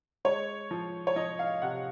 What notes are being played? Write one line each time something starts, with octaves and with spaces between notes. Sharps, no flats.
G#3 C#5
F3
C#5
F3 D#5
F5
C3 F#5